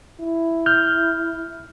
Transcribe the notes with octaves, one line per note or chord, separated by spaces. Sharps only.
E4
F6 G6